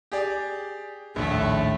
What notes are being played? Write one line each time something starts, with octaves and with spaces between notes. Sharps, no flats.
G4 G#4 D5
A#1 D#2 A2 A3